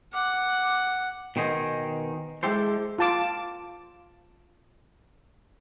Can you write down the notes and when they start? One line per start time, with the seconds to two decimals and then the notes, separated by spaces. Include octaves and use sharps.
0.13 F#5 D6
1.36 B2 D#3 C5 D#5 G#5
2.43 G#3 E4 G4 A4 C5
2.99 F4 A5 D6